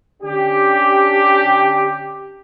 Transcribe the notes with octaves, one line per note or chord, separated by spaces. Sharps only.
D3 C#4 D4 G4